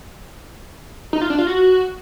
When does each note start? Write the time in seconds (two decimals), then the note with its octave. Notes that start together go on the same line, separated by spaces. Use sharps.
1.13 D#4
1.22 F4
1.30 D4
1.39 F4
1.47 F#4